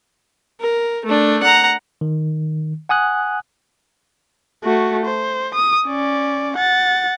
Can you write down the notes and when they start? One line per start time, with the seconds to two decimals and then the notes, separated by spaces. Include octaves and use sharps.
0.60 A#4
1.05 A3 D4
1.43 F#5 A#5
2.01 D#3
2.89 F#5 G#5 D#6 F#6
4.64 A3 F#4
5.06 C5
5.55 D#6
5.87 C#4 D5
6.57 F#5 A6